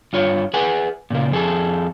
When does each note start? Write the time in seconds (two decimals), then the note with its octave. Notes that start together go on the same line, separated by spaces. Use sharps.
0.13 G2 F4 C#5
0.54 G#4 B4 F#5 G#5
1.10 A#2 C#3 A#3
1.32 F2 G#4 A4